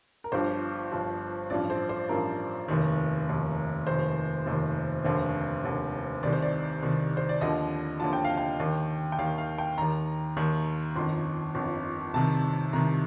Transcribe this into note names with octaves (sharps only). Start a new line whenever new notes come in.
A#4
G1 G2 F3 C5
G1 G2 F3
A1 G2 F3 D5
C5
C5
A1 G2 F3 A#4
F1 D#2 D#3
F1 D#2 D#3
F1 D#2 D#3 C5
F1 D#2 D#3
F1 D#2 D3 C5
F1 D#2 D3
C2 C3 D#3 D5
C5
D5
C2 C3 D#3
C5
D5
D#2 D3 F3 D#5
D#2 D3 F3 A5
G5
F5
G5
D#2 D#3
G5
D#2 D#3 F5
F5
G5
D#2 D#3 A#5
D#2 D#3
G1 F2 D#3 C6
G1 F2 D#3
C2 C3 D#3 A5
C2 C3 D#3 A#5